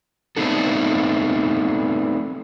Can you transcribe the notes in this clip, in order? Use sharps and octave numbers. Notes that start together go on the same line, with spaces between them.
A3 B3 C4 D4 D#4 A4